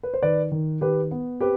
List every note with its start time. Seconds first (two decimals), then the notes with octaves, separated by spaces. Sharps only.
0.03 B4
0.14 C5
0.22 D#3 B4 D5
0.52 D#3
0.81 D#3 G4 B4
1.11 B3
1.41 C4 G4 B4